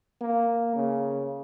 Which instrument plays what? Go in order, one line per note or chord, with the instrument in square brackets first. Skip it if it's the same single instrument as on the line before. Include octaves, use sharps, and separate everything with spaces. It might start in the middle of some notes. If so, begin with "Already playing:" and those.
[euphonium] A#3
C#3